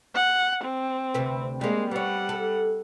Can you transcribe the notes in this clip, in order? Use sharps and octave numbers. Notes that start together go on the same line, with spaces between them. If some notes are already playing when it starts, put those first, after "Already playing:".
F#5
C4
D2 C3 B4
G3 G#3 A#3
G3 B3 C#5 F#5
A4